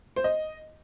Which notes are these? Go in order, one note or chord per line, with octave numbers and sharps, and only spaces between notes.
C5
D#5